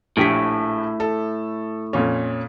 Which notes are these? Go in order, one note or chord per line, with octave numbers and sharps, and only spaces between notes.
A#1 A2 G4 B6
A4
F2 A#2 C#4